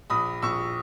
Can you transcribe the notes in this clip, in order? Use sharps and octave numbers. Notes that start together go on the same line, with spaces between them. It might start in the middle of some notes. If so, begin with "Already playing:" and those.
A#1 B5 D#6
A#1 C#6 E6